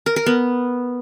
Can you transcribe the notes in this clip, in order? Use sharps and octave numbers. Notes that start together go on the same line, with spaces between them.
A#4
A#4
B3